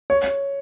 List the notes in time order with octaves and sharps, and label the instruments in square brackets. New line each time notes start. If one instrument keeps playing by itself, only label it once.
[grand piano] C#5